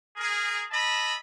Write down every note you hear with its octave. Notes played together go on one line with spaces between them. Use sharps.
G#4 A#4
D#5 E5 A5 B5